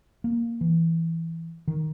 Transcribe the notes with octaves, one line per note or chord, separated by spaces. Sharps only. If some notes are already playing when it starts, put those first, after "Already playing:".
A#3
E3
D#3